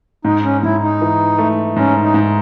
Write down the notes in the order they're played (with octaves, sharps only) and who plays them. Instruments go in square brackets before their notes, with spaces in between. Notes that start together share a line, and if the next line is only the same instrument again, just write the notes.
[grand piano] G#2 [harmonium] D#4
[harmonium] C#4
[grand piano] G#2 [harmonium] E4
[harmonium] D#4
[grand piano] E3
A3
[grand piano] G#2 [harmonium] C#4
[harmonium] D#4
[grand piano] G#2